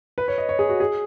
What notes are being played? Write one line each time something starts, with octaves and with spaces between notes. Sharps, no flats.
B4
C#5
D#5
C#5
G#4
F#4
G#4